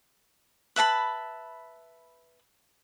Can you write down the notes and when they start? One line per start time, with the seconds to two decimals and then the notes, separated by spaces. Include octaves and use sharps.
0.76 B4 E5 A5 B5